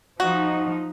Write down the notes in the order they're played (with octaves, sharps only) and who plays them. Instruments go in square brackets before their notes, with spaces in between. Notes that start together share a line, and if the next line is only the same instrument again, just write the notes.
[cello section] F3 D#4 [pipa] F#4